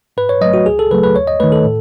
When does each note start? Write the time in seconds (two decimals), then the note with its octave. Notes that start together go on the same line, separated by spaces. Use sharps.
0.17 G#2 B4
0.29 C#5
0.41 F#3 A3 D#5
0.54 F#4
0.66 C#2 G#4
0.79 A4
0.90 C#3 F#3 A3 B4
1.03 B4
1.16 D#2 C#5
1.27 D#5
1.40 D#3 A3 B4
1.52 A4
1.64 A2